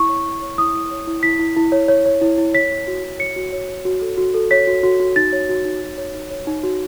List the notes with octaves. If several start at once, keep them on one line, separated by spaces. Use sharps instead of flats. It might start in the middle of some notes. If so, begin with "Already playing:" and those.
Already playing: E4 C#6
C#5
E4
C#5
E4 D#6
E4
C#5
E4
E4 B6
E4
E4
C#5
C#5
C#5
E4
E4
C#5 B6
C#5
F#4
F#4
C#5 C#7
F#4
C#5
C#5
F#4
A4
F#4
A4
C#5 B6
F#4
F#4
F#4
D#4 A6
C#5
F#4
D#4
F#4
C#5
D#4
C#5
D#4
F#4